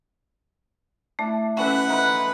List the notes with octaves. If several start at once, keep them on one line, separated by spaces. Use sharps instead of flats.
A3 D4 E4
C#4 A4 B4 D5 E5 F#5 G#5
D#4 B4 C5